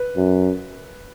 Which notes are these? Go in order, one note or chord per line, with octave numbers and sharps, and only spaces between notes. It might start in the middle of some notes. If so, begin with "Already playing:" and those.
Already playing: B4
F#2